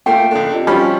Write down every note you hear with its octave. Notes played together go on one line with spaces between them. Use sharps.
A3 A#3 F4 G5
C#2 D4 A4
C3 F4 D#5
F3 G3 C#4 B5